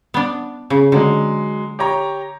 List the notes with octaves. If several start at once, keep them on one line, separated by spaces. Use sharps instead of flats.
B3 D4
C#3
D3 F#3 G#3
G4 C#5 A#5